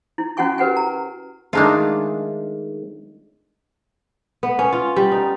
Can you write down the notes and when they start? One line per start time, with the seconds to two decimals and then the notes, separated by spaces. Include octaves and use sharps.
0.18 E4
0.37 C#4 E4 F#4 F#5 G#5 C#6
0.58 G4 A#4 B4 F#5 G#5
0.77 A#5
1.53 D#3 G#3 A3 D4 D#4 F4
4.43 B3
4.59 C#4
4.73 F4
4.96 G3
5.12 D#4